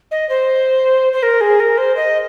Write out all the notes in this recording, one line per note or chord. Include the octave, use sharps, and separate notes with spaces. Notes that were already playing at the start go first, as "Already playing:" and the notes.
D#5
C5
C5
A#4
G#4
A#4
C5
D#5